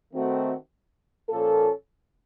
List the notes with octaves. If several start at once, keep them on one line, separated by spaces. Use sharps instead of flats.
D#3 A3 C4 F#4
A#2 F3 A#3 C#4 A4